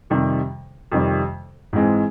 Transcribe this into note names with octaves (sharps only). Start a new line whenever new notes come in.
F2 C3 D#3 G3
F2 C3 D#3 G3
G#2 E3 G#3 C4